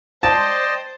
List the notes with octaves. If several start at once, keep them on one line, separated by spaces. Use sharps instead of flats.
C5 D5 D#5 G5 A5